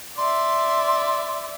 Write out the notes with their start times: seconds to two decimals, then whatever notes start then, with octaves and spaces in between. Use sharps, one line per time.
0.17 D5 E5 C6